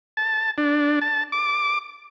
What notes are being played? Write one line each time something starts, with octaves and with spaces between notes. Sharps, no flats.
A5
D4
A5
D6